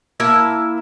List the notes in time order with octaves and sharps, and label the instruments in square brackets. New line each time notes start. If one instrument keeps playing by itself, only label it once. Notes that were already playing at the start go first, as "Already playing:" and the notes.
[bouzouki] A#3 E4 A5